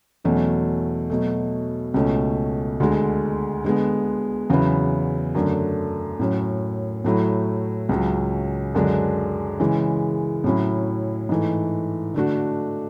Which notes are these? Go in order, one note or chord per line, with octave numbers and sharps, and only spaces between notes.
E2 B2 F#3 A3 C#4
B2 F#3 A3
C#2 B2 A3 C#4
D2 D3 G#3
D3 G#3 B3
E2 C#3 F#3 B3 E4
F#2 D3 A3 D4
A2 F#3 C#4
A2 F#3 A3 E4
C#2 C#3 F#3
F#2 D3 G#3 D4
C#3 E3 G#3
A2 F#3 C#4 E4
G#2 E3 A3
D3 A3 D4 F#4